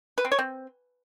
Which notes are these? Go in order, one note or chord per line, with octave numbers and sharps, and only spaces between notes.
B4
C4
C#5
C4